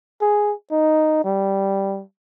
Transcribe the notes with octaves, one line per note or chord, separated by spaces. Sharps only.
G#4
D#4
G3